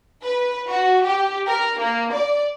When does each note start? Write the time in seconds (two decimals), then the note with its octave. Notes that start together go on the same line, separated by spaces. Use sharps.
0.25 B4
0.69 F#4
1.05 G4
1.48 A#4
1.80 A#3
2.14 D5